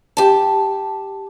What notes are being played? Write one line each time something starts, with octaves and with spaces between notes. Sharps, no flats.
G4 A5